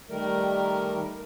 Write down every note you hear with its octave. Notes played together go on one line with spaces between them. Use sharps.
D#3 G3 A3 A#4